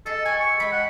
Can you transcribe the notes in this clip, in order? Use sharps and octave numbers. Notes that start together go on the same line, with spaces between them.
G#4 A4 D#5
F#4 G5 G#5
C#6
G#3 G5 B5
F#5